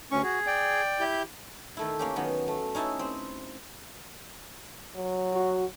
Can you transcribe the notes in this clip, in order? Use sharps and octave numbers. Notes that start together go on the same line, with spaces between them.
D2 C#4 C#6
F#4 G#4
D5 G5
E4 G4 G6
D#3 A3 E4
A#3 C#4 G4
D#3 F#3 B3
A3
C#4 D#4 E4 E5 A5
C4
F#3
F#4